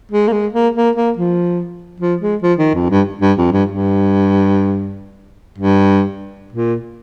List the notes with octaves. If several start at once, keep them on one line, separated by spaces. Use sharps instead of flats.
G#3
A#3
G#3
A#3
A#3
A#3
F3
F3
G#3
F3
D#3
F2
G2
G2
F2
G2
G2
G2
A#2